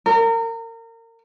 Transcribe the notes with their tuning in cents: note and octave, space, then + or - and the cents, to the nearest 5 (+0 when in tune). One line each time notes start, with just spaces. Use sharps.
A#4 -30